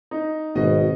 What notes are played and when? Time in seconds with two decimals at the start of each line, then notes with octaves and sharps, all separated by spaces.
0.11 D#4
0.55 G#1 B2 D#5